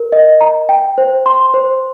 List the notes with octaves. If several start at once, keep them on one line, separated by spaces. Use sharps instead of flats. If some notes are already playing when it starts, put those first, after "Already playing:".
Already playing: A#4
D#5
A#5
G5
C5
C6
C5